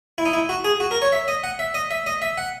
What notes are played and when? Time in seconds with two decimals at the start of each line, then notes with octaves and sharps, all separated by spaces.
0.18 E4
0.25 D#4
0.33 E4
0.49 F#4
0.64 G#4
0.80 F#4
0.91 A#4
1.02 C#5
1.12 E5
1.28 D#5
1.44 F#5
1.59 E5
1.74 D#5
1.91 E5
2.06 D#5
2.22 E5
2.38 F#5